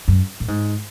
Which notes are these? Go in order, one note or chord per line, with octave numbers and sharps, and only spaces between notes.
F#2
A2
G#2